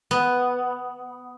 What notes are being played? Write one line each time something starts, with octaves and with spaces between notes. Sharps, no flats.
B3